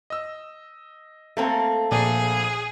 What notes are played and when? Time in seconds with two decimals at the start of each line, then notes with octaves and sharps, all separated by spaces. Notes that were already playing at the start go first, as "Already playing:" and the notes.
0.10 D#5 E6
1.37 A3 A#3 C4 A4
1.92 A#1 A#2 G#4 D5 G#5